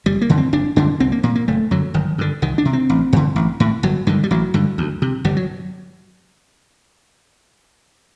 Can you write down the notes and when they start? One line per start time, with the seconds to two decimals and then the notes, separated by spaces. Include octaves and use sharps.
0.06 F#1 G3
0.21 A#3
0.30 F#2 D3
0.37 C4
0.53 F#1 D4
0.76 F#2 D3 D4
1.00 C2 C4
1.12 A#3
1.23 A#2 A#3
1.36 A#3
1.48 F#1 A3
1.71 F#2 D3 F#3
1.94 G1 D#3
2.18 G2 D3
2.42 C2 D#3
2.58 D4
2.65 C3
2.73 C4
2.89 A1
3.13 G2 D3
3.36 A1
3.60 A2
3.83 G1 F#3
4.07 G2 D3 D#3
4.24 G3
4.31 A1 F#3
4.54 G2 D3
4.78 D2
5.02 C3
5.25 G1 G3
5.37 F#3